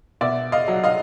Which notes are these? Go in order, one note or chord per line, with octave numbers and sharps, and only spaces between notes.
B2 D5 E5
D#5 F5
F#3
D#5 F5